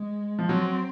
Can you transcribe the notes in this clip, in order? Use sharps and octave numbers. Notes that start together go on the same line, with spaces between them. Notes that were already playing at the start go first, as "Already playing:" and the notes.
Already playing: G#3
F3
F#3 C4